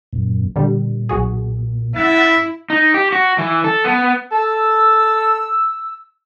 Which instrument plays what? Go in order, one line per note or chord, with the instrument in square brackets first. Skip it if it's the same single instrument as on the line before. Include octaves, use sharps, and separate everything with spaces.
[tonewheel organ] F#2 A#2
[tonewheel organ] A#2 [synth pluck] D3 G3
[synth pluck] B1 F#4 G#4
[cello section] E4 [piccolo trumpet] E5 [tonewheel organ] F#5 A6
[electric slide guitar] D#4
G4
F#4
E3
A4
B3
[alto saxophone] A4 [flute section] E6